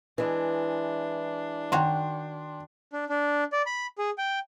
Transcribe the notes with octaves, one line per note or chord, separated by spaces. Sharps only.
E3 G#3 D4
D#3 F#4 C#5 G5 C6
D4
D4
D5
B5
G#4
G5